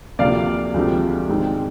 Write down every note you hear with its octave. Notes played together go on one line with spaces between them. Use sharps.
D2 C3 F3 A#3 D5 F5
D2 C3 F3 G#3 C4
G#2 D#3 G#3 C4